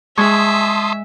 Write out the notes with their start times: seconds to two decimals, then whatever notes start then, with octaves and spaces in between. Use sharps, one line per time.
0.18 G#3 G#4 E5 A5 C6 C#6 D#6 G#6